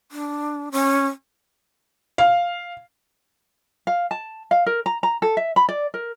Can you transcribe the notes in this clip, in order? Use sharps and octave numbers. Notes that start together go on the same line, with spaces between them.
D4
C#4
F5
F5
A5
F5
A#4
A#5
A#5
A4
E5
B5
D5
A#4